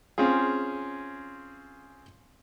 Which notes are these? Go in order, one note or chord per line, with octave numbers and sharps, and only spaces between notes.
C4 C#4 F4 G#4